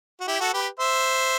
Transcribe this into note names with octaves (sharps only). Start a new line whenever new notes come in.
F#4
E4 G4
F#4 A4
G4 B4
C5 E5